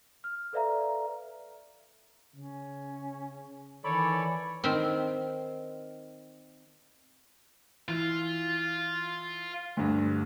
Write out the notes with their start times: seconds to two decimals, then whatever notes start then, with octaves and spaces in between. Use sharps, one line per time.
0.24 F6
0.53 A4 B4 D5 E5 F5 A#5
2.34 C#3 C#4
3.84 D#3 E3 A4 C#5 D5 B5
4.64 D#3 C4
7.88 E3 F4
9.77 D2 G2